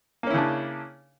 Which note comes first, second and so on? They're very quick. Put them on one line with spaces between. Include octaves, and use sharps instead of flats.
A#3 C#4 E4 C#3 D4